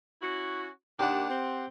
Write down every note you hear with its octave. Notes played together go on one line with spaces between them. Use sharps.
C#4 E4 F#4
D#2 D4 G4 F#5
C4